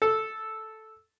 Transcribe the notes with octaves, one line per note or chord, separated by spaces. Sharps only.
A4